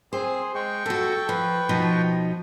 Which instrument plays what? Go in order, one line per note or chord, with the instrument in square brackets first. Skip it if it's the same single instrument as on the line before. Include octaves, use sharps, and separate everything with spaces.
[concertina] C4 [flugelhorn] G#4 [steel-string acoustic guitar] C5
[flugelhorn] G#3 [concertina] G5 C#6
[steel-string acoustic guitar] B2 F#4 [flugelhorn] A4
[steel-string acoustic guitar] F3 [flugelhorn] B4
[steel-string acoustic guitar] B2 F3 D#4